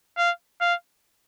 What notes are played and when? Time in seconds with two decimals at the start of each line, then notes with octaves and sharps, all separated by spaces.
0.17 F5
0.61 F5